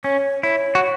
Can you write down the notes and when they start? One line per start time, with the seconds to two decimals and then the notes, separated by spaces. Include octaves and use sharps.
0.04 C#4 C#5
0.43 E4 C#5
0.75 F#4